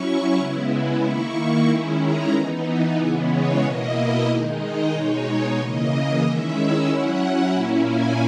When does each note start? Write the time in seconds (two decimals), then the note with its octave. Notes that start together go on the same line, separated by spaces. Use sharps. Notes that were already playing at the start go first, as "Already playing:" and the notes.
Already playing: F#3 C#4 E4 C#6
0.37 C#3 G#3 B3 E4 E6
1.02 D#3 A#3 E4 C#6
1.67 D#3 G#3 C#4 E4
2.00 A#5
2.33 E3 B3 D#4
2.97 C#3 E3 G#3 B3 E5
3.30 C#5
3.62 B2 A#3 E4 D#5
4.28 D#3 G#3 D#4
4.60 D#5
4.93 B2 G#3 D#4 C#5
5.58 C#3 E3 A#3 D#5
6.23 D#3 G#3 C#4 E4 E5
6.88 F#3 C#4 E4 F#5
7.53 A#2 A#3 C#4 E4
7.86 G#5